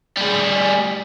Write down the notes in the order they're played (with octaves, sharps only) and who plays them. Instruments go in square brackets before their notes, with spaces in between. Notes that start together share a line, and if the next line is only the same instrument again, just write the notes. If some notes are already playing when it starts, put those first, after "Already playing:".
[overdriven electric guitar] G3 G#4